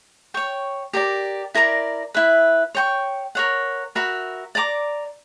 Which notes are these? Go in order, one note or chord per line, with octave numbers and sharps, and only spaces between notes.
C#5 G5 C#6
G4 A#4 D5
E4 A#4 D5 A#5
E4 B4 E5
C#5 G5 C#6
A#4 C#5 F#5
F#4 A#4 E5 B5
D5 A#5 D6